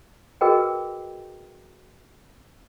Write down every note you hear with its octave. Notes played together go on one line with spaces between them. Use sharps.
F#4 G#4 A#4 B4 D#5 G5